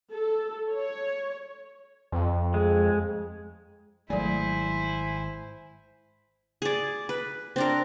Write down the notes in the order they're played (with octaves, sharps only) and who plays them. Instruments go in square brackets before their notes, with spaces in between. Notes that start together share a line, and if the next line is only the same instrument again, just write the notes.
[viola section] A4
C#5
[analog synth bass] F2
[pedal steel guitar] G#3
[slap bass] G#1 G#3 [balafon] F#3 A3 D5 [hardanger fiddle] E4 C5 [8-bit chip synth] G#5
[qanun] G#4 D5
B4
C4 D4 A#4